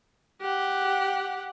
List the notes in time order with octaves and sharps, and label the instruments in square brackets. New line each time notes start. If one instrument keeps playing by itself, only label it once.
[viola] G4 F#5